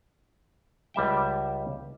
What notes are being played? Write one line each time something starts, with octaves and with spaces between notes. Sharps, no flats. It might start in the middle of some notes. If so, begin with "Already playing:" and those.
C#2 G3 E5 G5